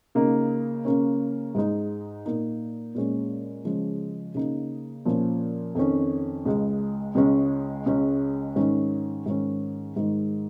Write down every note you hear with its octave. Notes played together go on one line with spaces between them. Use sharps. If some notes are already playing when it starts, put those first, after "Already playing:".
C#3 A#3 D#4
C#3 A#3 C#4
G#2 G#3 D#4
A#2 A#3 D#4
A#2 G#3 C#4
C#3 F3 G#3 C#4
C#3 A#3 D#4
A#2 F3 C#4
F2 D#3 C#4
C#2 C#3 G#3
C#2 C#3 G#3 C#4
C#2 C#3 G#3 C#4
G#2 D#3 C#4
G#2 D#3 C#4
G#2 D#3 G#3